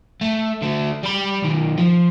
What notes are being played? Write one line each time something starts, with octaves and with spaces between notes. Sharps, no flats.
A3
D3 A3
G3 B5
B1 D#3
F3